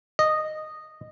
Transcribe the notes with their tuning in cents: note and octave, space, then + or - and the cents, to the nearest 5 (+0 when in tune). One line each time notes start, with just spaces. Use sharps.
D#5 -10